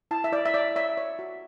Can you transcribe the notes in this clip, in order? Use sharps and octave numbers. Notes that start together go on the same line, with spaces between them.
E4 A5
E5
E4 D5
E5
C#5 D5
C#5 E5
C#5
F#4